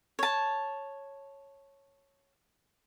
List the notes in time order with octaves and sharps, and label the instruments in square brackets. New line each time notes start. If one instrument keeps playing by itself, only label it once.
[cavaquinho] C#5 A5